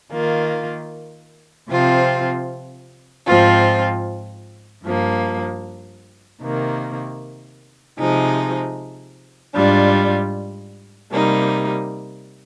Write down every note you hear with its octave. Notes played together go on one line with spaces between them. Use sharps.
D#3 A#3 F4
C3 F3 C4 F4
G#2 F3 C4 F4
G2 F3 A#3
C3 D#3 A#3
C3 F3 G#3 D#4
G#2 G3 D4 F4
C3 G3 A#3 D#4